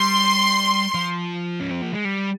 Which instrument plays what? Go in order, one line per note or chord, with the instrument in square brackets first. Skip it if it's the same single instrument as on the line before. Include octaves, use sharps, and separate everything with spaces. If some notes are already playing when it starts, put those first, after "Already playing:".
Already playing: [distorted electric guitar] G3 [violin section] C6
[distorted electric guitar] F3
C#4
C4
A#3
G#3
G3